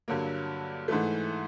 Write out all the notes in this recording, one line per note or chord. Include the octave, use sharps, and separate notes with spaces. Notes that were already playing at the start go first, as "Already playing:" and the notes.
G2 D3 F#3 A#3
G#2 E3 A3